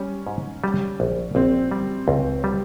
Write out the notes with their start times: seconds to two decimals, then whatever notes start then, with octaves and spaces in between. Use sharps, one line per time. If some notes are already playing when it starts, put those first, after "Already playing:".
Already playing: G3 C#4
0.27 G#2
0.64 G3
1.00 A#1
1.35 A#1 C4
1.71 G3
2.08 C#2
2.44 G3